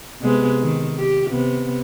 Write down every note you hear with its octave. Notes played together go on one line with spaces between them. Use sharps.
C3 G#3 B3
D#3
G4
C3 B3